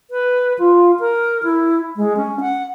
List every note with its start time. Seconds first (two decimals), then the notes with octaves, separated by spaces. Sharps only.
0.11 B4
0.59 F4
1.00 A#4
1.43 E4
1.97 G#3
2.17 C#4
2.41 F#5